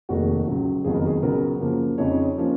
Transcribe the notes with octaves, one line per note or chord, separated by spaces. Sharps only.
F1 D#2 D#3 G#3 F#4
C#2 C#3 F#3
F#1 F2 D#3 F#3 B3 G#4
A#4
G#4
C#2 C#3 F#3 B3 A#4
F#2 C#3 F3 A#3
F2 C#3 G#3 D#4 C#5
F3 A#3 C#4